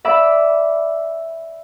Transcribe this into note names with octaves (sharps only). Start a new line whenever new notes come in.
D5 E5 B5 D6